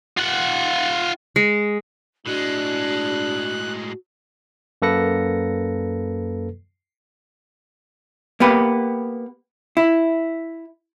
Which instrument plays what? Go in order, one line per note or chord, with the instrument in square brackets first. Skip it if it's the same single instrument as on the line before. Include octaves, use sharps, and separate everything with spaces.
[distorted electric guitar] F4 F#5
[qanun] G#3
[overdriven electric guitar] A2 G#3 [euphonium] D4 [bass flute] F#4 [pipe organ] F#6
[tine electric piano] F#2 A#3 A4 B4 A#6 C#7
[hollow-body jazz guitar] A#3 B3 G4 B4
E4